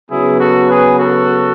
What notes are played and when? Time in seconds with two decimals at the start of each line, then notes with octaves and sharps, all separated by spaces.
0.10 C#3 F#3 B3 E4 G#4
0.40 F#4 A4
0.70 G#4 B4
0.99 F#4 A4